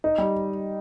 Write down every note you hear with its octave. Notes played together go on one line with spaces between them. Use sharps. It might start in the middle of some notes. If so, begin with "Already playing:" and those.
D#4
G3